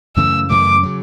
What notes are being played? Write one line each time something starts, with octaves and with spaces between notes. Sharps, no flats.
F#2 C#3 E3 A3 E6
F#2 C#3 E3 A3 D6
C#3 F#3